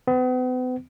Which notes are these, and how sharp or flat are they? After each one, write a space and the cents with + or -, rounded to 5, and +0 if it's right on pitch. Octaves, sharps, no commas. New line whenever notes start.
B3 +40